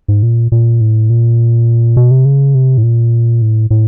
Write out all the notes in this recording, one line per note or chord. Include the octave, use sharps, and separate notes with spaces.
G#2
A#2
A#2
A2
A#2
B2
C3
C#3
C3
A2
A#2
A2
A2